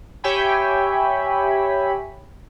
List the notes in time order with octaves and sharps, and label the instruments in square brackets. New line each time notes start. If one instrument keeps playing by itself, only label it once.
[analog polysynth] G4 C#5 E5 G5 G#5 B5